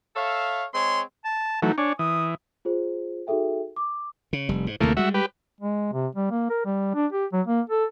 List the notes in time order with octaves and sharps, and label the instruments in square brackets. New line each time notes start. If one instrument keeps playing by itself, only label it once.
[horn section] A4 C#5 E5 F5
G#3 C4 G#4 C#5 C6
[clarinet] A5
[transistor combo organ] E3 F#3 A3 [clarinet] D#4
[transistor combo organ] D4 C#5 [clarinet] G#5
[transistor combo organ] E3 [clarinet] D#6
[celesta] F4 G#4 C5
D#4 F#4 G#4 A4 E5 G5
D6
[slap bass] C#3
F1 G3
G#2
[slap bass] D2 C3 E3 [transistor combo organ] A3 A#3
[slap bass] G3 G#3 [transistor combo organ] F#4 E5
[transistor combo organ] G4 B4
[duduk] G#3
C3
G3
A#3
A#4
G3
D4
G4
F#3
A#3
A4